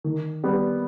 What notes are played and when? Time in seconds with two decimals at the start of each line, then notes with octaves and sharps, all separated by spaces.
0.04 D#3
0.43 G3 B3 G4